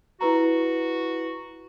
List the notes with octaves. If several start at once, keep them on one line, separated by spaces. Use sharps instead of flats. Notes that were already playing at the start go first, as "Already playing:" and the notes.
E4 F#4 B4 A#5